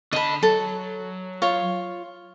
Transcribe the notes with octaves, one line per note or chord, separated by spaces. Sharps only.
D3 D#5 A5 B5
F#3 A4
F4 C#5